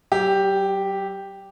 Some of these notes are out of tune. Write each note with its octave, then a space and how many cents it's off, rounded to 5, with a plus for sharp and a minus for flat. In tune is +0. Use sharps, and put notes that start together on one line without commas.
F#3 +45 G4 +0